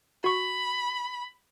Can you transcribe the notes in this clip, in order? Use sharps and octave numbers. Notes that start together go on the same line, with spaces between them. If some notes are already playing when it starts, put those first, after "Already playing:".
F#4 B5 C#6